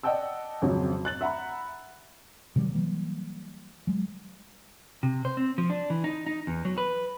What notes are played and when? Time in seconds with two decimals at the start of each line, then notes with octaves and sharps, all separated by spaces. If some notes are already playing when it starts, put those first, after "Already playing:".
0.03 D5 D#5 F#5 G5 A5 E6
0.62 G#1 F2 C#3 F#3
1.05 F#6 A6 F#7
1.21 E5 F#5 A#5 B5
2.56 C3 D#3 F#3 G3
2.74 E3 F#3 G3 A#3
3.87 F#3 G#3
5.03 C3
5.25 C5
5.37 C4
5.58 F3
5.70 D4
5.90 E3
6.04 D#4
6.26 D#4
6.47 E2
6.65 F#3
6.78 B4